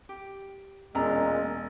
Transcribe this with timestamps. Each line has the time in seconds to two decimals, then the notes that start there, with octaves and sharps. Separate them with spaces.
0.09 G4
0.95 E1 A#2 G#3 C#4 A#5